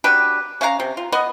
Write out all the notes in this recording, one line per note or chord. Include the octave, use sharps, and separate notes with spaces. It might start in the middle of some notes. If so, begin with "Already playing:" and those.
F#3 D4 G4 B4
C#4 F5 F#5 A#5
C3
F4
B3 D#5